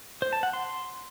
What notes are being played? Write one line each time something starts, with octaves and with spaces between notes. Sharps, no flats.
C5
A5
F#5
C6